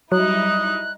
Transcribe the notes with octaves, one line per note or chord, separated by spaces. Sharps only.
F#3 G3 D#4 E4 D#6 F#6